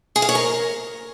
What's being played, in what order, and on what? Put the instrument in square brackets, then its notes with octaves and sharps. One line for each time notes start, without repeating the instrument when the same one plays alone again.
[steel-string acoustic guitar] G#4
F5
C#5
A#4